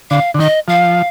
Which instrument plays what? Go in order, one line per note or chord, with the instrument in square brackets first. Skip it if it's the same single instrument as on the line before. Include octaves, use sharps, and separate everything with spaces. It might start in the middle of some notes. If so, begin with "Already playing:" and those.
[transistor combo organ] D3 [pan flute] F5
[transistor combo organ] D3
[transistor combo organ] D#3 [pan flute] D#5
[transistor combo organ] F3 [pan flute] F5